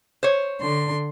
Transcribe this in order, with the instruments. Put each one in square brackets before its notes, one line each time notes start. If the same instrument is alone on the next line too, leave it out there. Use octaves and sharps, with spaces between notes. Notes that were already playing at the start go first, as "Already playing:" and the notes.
[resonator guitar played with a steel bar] C5 C#5
[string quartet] D3 C6